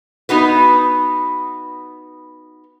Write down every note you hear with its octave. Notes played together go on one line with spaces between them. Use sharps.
B3 D#4 F#4 B4